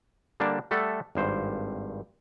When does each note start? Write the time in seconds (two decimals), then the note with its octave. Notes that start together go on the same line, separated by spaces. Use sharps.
0.40 D3 G3 A#3 D4 A5
0.71 G3 A3 A4 E5 F#5
1.15 G#1 G2 C5